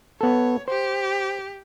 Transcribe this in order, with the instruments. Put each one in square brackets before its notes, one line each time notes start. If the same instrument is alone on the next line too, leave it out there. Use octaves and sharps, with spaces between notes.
[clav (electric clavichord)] B3 A4 [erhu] C#5
[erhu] G4 [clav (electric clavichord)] C5